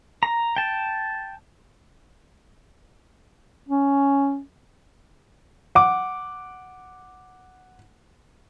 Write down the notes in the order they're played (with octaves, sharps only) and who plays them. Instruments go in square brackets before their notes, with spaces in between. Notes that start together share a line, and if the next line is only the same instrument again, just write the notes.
[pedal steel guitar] A#5
G5 A5
[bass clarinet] C#4
[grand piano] F#5 D6